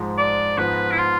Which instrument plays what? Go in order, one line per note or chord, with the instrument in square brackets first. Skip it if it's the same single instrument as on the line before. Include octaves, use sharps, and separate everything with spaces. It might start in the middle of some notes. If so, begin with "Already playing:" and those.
Already playing: [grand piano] G#2 F3 G#3
[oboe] D5
[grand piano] G#2 F3 B3 [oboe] B4
[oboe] E4
F4